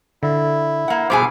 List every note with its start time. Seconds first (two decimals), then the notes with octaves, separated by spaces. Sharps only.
0.23 D3 E4
0.88 A#3 F#5
1.10 G2 B2 G#4 C5 G#5 D6